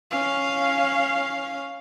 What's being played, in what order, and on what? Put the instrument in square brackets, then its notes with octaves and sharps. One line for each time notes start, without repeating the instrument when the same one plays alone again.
[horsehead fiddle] C#4 F5